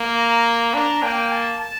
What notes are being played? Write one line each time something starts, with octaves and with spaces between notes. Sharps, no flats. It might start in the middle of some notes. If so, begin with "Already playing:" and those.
Already playing: A#3
A#5
D4 A#5
A#3 G5
A5
A5